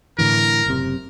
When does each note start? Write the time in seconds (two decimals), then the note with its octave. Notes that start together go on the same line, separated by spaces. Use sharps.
0.18 A2 D3 E3 A#4
0.66 F#1 C3